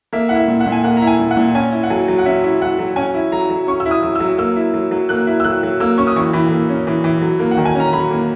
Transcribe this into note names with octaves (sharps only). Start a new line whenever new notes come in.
A#3 E5
E4 F#5
E5
A#2
F#5
A#2
G#5
A#3 F#5
A#5
E4
G#5
A#2
F#5
A#2
C#4 G#5
E4
F#5
F#3 G#5
F#3
F#5
C#4 E5
E4
F#3 F#5
F#3
C#4 G#5
E4
F#3 A#5
F#3
C#4 C#6
E6
E4
D#6
F#3
F#3 E6
A#3 E6
E4
F#3
F#3
A#3 F#6
E4
E6
F#3 F#6
F#3
A#3 E6
C#4 C#6
D#6
E3 C#6
E3 B5
A#3
C#4
E3
E3
F#3
A#3
F#5
D#3
G#5
C#4 A#5
F#3 B5
A#3